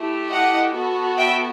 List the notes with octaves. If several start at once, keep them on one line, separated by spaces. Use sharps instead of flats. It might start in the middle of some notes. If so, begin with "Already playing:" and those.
Already playing: A3 E4 G4
D#5 F#5
B3 F#4 A4
E5 G5